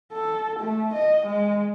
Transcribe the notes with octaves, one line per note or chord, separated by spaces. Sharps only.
A4
A3
D#5
G#3